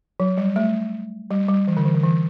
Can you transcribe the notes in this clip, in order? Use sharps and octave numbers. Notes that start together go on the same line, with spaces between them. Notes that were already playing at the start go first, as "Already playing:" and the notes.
F#3
G3
A3
G3
G3
E3
D3
E3
D3
E3